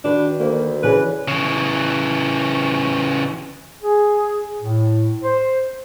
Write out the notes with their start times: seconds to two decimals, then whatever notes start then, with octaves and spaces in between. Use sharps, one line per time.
0.04 D#3 D4 F#4 B4
0.40 D2 A#3
0.83 C#3 E3 G#4 B4
1.28 C#3 E3
3.83 G#4
4.62 A2
5.23 C5